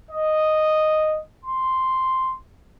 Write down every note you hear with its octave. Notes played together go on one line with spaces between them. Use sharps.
D#5
C6